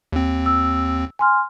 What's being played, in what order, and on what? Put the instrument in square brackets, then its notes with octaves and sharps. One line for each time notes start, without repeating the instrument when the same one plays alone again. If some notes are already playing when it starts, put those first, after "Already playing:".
[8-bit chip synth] D#2 C4
[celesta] E6
G#5 C6 F6